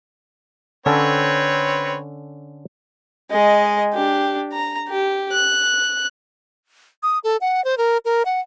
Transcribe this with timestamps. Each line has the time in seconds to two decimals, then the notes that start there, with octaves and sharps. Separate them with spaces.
0.86 D3 C4 C#4 A4 B4 C#5
3.31 G#3 D#5
3.93 D4 G4
4.53 A#5
4.89 G4
5.32 F#6
7.03 D#6
7.24 A4
7.41 F#5
7.64 C5
7.78 A#4
8.05 A#4
8.25 F#5